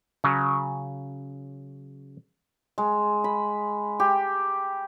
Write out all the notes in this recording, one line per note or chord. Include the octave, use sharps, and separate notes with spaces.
C#3 F#3
G#3
B5
G4